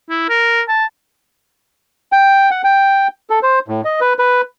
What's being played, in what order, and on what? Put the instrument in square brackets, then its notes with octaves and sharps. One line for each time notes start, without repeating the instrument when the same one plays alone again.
[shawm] E4
A#4
A5
[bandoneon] G5
F#5
G5
A4
C5
A2
D#5
B4
B4